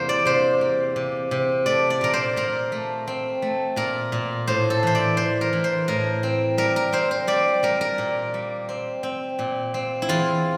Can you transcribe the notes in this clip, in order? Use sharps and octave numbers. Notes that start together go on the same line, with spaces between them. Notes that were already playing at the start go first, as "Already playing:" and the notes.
Already playing: E2 C3 G3 A#3 A#4 C5
D5
C3 C5
A#3
C3
C3
A3 D5
D5
A#2 A#4
C5
A#2 A#4
A3
C4
A3
A#2 A#4
A#2
A2 C5
A4
E3 C5
D5
E3 C5
A#4
E3
C5
A2 A#4
C4
G3 A#4
A#4
C4 C5
C5
G3 D5
G3 A#4
A#4
A#2
G3
C4
C4
A#2
C4
E4
E2 F4